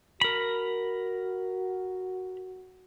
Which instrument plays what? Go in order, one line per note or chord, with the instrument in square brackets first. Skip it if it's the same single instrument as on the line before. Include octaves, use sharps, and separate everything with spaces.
[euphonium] F#4 [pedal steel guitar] A#4 B5